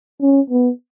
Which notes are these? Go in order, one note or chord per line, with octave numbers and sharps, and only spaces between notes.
C#4
B3